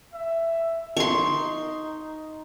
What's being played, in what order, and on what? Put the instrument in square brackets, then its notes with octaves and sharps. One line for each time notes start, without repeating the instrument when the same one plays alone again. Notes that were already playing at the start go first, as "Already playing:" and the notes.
[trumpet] E5
[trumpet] D#4 [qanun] C6 C#6